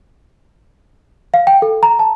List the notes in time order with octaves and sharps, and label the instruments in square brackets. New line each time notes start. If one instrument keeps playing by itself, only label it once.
[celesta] F5
G5
A4
A#5
A5